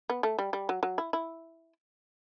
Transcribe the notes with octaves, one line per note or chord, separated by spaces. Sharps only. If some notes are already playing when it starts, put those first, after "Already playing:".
B3
A3
G3
G3
F#3
F#3
E4
E4